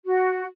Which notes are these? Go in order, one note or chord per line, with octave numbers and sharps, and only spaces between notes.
F#4